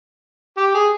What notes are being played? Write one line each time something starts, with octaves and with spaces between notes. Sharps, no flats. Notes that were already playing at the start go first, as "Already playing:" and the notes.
G4
G#4